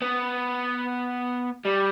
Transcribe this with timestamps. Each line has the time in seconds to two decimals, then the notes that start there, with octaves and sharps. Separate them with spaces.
0.02 B3
1.65 G3